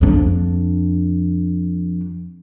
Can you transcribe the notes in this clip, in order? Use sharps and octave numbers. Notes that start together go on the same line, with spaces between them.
F2 D4